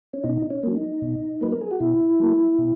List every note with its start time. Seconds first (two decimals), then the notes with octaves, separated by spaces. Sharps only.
0.13 C#4
0.24 B2 D#4
0.50 C#4
0.63 F#3 A#3
0.76 D#4
1.02 B2
1.41 F#3 A#3 B4
1.51 A#4
1.61 G#4
1.71 F#4
1.80 B2 E4
2.20 F#3 A#3
2.59 B2